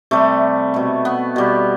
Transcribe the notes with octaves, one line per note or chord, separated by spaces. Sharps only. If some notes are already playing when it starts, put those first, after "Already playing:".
C3 G3 A3
B2 A3
B3
B2 G3